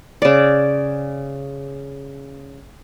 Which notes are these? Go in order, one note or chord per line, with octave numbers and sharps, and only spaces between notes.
C#3 D5